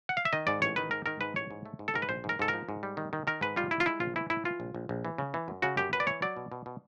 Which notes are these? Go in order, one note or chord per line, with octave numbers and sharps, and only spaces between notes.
F#5
F5
E5
D#3 D#5
G#2 D5
A1 C#5
D#3 B4
G#2 A#4
D#3 A#4
G#2 B4
A1 C#5
G#2
A3
G#2
A4
G#2 A#4
B4
A#1 C5
G#2
A#4
G#2 A4
A#4
F3
G#2
G3
D#3
D#3
D#3 A#4
G#2 B4
G3 F4
G3 E4
F4
G#3 E4
A#1 F4
E3 E4
A2 E4
E3 F4
A#1
A#1
A#1
E3
C#3
E3
F#2
C#3 F#4
F#2 G4
F#2 B4
D5
E3 C#5
F#3 D5
B2
B2
B2